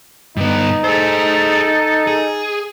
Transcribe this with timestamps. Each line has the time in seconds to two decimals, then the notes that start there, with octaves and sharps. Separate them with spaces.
0.37 G2 B3 D#4
0.84 G#4 A4 C5
2.07 G#4